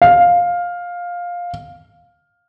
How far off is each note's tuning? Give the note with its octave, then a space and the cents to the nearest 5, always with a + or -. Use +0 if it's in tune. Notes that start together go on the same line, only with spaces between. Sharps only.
F5 +10